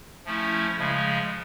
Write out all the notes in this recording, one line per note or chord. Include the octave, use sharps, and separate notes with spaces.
F3 A3 C#4 E4
C#3 F3 G#3